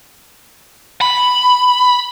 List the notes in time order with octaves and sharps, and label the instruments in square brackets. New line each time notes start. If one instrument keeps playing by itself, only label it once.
[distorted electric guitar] B5